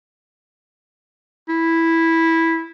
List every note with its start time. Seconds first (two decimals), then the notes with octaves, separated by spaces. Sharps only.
1.49 E4